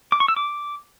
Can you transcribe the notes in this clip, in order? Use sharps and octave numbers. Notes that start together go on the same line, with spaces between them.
D6
C#6
E6
D6